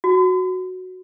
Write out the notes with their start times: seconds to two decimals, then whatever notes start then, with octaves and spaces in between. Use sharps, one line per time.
0.04 F#4